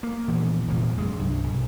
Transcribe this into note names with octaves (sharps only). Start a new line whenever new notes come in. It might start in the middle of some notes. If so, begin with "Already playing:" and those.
A#3
A#1 E3 F3 B3
F1 A#1 E2 F3
F#2 G#3
C2 G2
B1